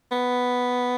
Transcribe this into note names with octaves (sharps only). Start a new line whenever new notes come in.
B3